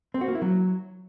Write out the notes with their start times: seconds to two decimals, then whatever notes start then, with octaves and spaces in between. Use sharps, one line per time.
0.14 C4
0.21 F#4
0.28 A#3
0.35 E4
0.42 F#3